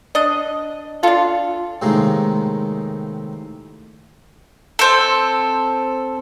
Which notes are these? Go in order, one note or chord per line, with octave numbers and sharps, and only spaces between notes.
D4 D#5
D4 F4 A4
A2 C3 D#3 G#3 A#3
C4 A4